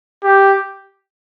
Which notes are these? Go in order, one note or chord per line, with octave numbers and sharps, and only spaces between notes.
G4